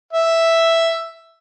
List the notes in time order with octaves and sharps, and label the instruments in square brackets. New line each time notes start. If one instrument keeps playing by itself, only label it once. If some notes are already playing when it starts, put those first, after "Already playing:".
[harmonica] E5